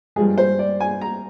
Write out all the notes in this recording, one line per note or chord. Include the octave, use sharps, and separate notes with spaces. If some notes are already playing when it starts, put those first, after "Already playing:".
G2 F3 G#3 G#4
C5
D5
G#5
A#5